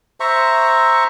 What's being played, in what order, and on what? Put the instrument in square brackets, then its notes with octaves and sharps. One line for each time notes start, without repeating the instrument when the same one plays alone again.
[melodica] C5 E5 A#5 C#6